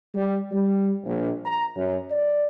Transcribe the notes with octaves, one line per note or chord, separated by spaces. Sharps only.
G3
G3
A#1
A#5
F#2
D5